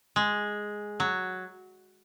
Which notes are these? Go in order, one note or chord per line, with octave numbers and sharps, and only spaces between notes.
G#3
F#3